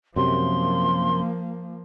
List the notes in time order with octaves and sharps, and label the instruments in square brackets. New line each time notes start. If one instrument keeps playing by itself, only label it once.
[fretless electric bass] F#2 C3 [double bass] F3 A#3 [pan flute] C6